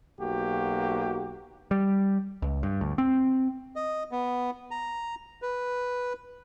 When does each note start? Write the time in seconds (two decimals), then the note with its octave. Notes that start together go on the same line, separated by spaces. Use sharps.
0.20 B1 A#3 F#4 G4
1.71 G3
2.42 C#2
2.63 G2
2.81 D2
2.98 C4
3.76 D#5
4.11 B3
4.71 A#5
5.42 B4